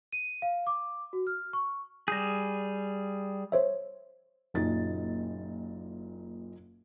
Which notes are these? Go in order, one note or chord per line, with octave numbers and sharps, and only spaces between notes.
D#7
F5
D6
F#4
F6
C#6
G3 G#4 G6 A#6
C5 C#5 E5
F#1 A#2 D#4 A6